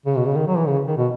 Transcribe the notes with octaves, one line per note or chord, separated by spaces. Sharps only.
C#3
B2
C#3
D#3
F#3
E3
C#3
D#3
B2